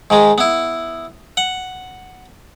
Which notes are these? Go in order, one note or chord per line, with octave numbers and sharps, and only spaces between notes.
G#2 D#3 G#3
B3 E4
F#5